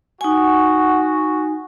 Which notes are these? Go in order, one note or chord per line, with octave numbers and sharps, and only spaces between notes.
D#4 F#4 G#5